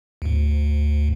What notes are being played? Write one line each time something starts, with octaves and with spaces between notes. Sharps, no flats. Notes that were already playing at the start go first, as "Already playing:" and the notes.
D2 G#2